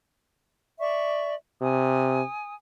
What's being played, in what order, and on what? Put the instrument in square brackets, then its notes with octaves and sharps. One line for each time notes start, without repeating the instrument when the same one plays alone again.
[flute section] D5 E5 C#6
[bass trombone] C3 [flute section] G#5 D#6